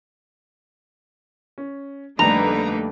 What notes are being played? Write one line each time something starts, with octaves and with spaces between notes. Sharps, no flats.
C#4
F2 D3 G3 A3 A#3 D#4 B4 A#5